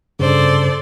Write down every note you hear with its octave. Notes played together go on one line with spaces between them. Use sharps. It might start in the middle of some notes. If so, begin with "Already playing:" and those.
G2 C#3 A4 C5 D5